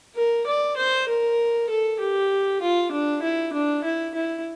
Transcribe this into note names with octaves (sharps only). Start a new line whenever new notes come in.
A#4
D5
C5
A#4
A4
G4
F4
D4
E4
D4
E4
E4